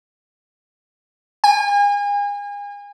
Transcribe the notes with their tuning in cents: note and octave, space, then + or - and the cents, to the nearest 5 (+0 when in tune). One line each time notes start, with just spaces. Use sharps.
G#5 -35